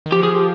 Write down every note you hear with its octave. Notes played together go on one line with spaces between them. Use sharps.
D#3
F3 G4
G#4
G4